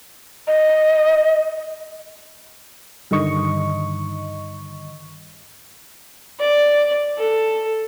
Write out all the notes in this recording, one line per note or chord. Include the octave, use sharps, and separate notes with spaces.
D#5
G2 D3 D#3 D#5 C#6
D5
A4